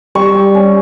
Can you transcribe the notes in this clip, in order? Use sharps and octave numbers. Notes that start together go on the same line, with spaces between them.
G3 C#6
G3
C#4